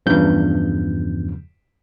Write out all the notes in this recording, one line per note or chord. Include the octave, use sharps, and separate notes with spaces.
E2 G2 C#3 F3 G6